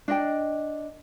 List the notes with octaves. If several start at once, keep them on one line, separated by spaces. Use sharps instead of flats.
D4 D#5 G5